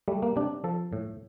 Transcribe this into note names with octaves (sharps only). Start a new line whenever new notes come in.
G3 A3
A#3
C3 D4
F3 A4
A2